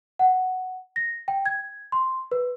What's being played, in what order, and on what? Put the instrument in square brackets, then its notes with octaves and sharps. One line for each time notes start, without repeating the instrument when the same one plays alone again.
[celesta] F#5
A#6
G5
G#6
C6
B4